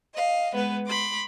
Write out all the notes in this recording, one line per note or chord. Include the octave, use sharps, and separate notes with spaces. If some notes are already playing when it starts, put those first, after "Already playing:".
D#5 F5
G#3 B3 B4
B5 C6 D6